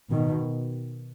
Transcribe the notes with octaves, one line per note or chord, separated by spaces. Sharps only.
B2 D#3